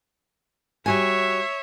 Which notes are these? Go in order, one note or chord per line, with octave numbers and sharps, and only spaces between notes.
G3 F#4 C#5 E5 G#5